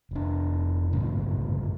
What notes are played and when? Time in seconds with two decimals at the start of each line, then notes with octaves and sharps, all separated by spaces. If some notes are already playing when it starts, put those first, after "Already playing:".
0.11 F1 D4
0.93 G1 F#2 A2 C#3